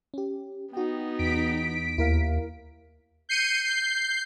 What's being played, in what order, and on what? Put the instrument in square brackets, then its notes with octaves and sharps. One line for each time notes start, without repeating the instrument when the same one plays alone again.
[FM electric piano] C#4 G4
[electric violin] B3 D#4 [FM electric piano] F#4 G5
[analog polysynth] E2 B6 D7
[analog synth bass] D#2 [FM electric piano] E4 A#4 F5
[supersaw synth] G6 C7 C#7 D#7
G6 C7